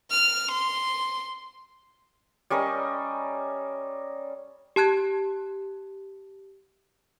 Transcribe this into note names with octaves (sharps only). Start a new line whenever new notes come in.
F6
C6
G3 C#4 A#4 D#5
G4 A5 F#6 G#6